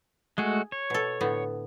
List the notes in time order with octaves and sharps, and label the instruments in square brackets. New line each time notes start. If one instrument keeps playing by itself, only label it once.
[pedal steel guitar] G#3 A3 F#4 [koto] G#4
[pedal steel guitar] C#5
[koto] B2 A4
A2 D3 B3